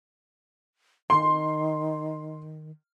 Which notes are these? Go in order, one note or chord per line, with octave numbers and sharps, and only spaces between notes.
D#3 C6